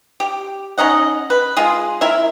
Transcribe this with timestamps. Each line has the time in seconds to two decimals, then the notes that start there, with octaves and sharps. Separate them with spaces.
0.20 G4
0.78 C#4 D#4 D#5 F#5
1.30 B4
1.57 G#3 F4 G#4
2.01 E4 A#4 E5